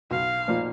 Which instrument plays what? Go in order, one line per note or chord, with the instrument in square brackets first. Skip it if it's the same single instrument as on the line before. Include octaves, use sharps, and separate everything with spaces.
[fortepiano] B1 [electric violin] F5
[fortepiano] A#2 F3 A#3 D#4